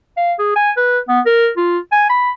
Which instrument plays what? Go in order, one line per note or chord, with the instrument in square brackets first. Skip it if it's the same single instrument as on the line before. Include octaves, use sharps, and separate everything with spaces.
[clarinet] F5
G#4
G#5
B4
B3
A#4
F4
G#5
B5